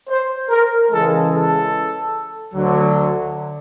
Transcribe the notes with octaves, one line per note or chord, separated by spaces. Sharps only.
C5
A#4
C#3 E3 G#3 A4
A4
D2 D3 F#3